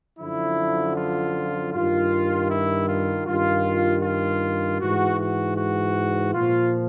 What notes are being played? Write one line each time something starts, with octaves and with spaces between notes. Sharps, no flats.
F#2 D3 F3 E4
F4
G2 D#3 F4
E4
F4
G2 D#3 F4
F4
G#2 E3 F#4
F#4
F#4
A#2 F3 F4